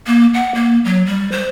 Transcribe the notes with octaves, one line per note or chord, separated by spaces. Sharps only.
A#3
F#5
A#3
F#3
G3
C5